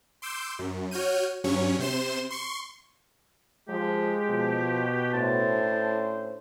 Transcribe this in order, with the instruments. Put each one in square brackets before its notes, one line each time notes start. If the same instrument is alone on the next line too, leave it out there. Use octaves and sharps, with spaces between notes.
[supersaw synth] C6 D6 E6 G6
F#2
F#4 C#5 F6 G6 D#7
G2 F#3 C#4 C#5
C3 C5 C6 E7
C6 C#6
[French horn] F3 [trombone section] G#3 [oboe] G4
[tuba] B2 [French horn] F3
[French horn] A2 [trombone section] C#4 D4 C5 [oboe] A5